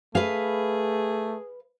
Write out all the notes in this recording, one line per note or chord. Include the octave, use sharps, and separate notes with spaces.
A3 G#4 B4 F5